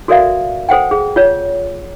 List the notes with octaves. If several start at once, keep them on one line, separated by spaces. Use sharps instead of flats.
F#4 A4 A#4 D5 E5 F5
A4 C5 F#5 G5
G#4
F4 C#5